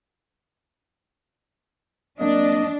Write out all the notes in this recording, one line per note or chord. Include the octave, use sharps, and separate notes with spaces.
F#3 A#3 C4 D4 D#5